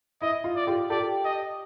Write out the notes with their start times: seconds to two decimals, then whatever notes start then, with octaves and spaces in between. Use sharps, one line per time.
0.22 E4 D#5
0.44 F4
0.56 D5
0.67 F4 G4
0.90 G4 A4 D5
1.25 D#5